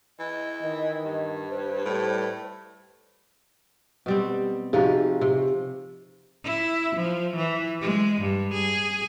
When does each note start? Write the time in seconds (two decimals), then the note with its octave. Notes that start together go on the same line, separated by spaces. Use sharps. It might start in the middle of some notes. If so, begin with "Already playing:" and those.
0.19 E3 D#5
0.62 D#3
1.05 G2
1.50 B4 C5
1.85 A2 G3
4.06 B2 G3 C4
4.73 C3 F3 D#4 F#4 G#4 B4
5.21 C3
6.44 E4
6.95 F3
7.36 E3
7.81 G#3
8.21 G2
8.53 G#4